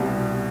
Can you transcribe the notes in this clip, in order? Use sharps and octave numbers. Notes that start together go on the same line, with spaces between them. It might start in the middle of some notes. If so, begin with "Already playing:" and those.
Already playing: C2 B2 G3